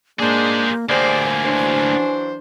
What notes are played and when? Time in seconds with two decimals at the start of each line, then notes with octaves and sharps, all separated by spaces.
0.19 G#3 A#3 D4 G#4 C5
0.89 D2 A#3 G4 G#4 C5 D5 G#5
1.44 E3 F#3 D4 C5